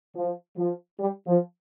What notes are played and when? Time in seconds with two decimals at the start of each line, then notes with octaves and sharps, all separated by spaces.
0.15 F3
0.56 F3
0.98 G3
1.27 F3